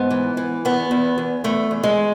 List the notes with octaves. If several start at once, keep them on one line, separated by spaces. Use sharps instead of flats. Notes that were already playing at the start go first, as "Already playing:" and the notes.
Already playing: G#2 B3
E3
E3
E2 B3
E2
E2
E2 A3
E2
G#3